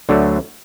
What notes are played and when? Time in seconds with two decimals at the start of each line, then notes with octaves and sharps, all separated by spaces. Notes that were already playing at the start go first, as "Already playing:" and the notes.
0.09 D2 D3 F#3 A3